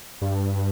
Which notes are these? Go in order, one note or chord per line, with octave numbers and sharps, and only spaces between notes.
G2